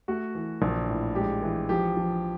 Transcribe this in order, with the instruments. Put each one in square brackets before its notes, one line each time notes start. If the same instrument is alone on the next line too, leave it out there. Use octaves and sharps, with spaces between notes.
[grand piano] A3 F#4
E3
A#1
A2
G#3 G4
E3
F3 G4
F3